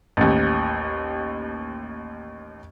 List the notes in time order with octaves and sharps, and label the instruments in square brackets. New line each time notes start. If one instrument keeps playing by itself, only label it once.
[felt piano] A1 D#2